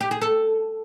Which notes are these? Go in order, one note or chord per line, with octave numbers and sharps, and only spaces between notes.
G4
G#4
A4